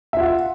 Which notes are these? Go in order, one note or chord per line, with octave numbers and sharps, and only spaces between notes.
F4 E5 F#5